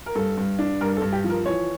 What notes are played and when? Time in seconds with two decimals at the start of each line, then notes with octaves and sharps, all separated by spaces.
0.06 A#4
0.15 G2 A4
0.37 G2
0.59 D4
0.81 G2 A#4
0.97 A4
1.02 G2
1.13 G4
1.24 F3
1.30 A#4
1.46 E3 C#5